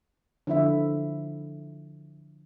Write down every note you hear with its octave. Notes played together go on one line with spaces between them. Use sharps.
D3 F3 E4 E5